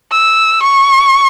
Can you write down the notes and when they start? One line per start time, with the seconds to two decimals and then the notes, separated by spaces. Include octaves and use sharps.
0.12 E6
0.63 C#6